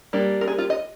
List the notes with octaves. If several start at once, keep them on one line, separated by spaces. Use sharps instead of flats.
G3 A#3 D4
A#4
G#4
F4
D#5